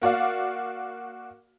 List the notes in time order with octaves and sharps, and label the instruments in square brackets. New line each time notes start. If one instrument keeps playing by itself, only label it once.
[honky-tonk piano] A#3 F#4 D5 F5